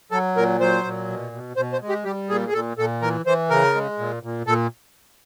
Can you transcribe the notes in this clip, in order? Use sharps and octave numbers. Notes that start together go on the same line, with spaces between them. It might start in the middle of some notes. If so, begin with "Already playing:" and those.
F#3 A4
A#2 A#4
F#3 C5
A#2
B2
B2
B2 C5
C5
G#3
G4
G3 G4
A#2 G#4
G#4
A#2 A4
A#2 A4
E3 A#4
E3 C5
C#3 A#4
G#3
A#2
A#2
A#2 A4